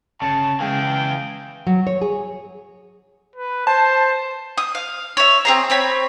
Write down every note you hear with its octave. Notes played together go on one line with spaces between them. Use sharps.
G1 C#3 A5 C#7
C#3 E3 G#3 C#4 G#4 F5 G5
F#3
C#5
G#4
B4
C5 A5
D#6
F5
C#5 E5
C4 G#4 A#5
C4 C#5 B5